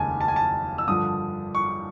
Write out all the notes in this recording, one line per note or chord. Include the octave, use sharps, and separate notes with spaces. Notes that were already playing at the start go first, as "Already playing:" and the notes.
Already playing: F1 D#2 C#3 G#3 G#5 A5
A5
G#5
A5
E6
G2 D3 F3 D#6
C#6